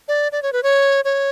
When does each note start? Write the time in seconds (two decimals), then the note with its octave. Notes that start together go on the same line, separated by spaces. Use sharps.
0.08 D5
0.32 D5
0.43 C#5
0.53 B4
0.63 C#5
1.05 C#5